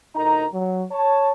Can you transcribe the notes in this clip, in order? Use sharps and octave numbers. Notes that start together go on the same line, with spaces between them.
D2 A2 D#4 A#4 A#5
F#3
C#5 A5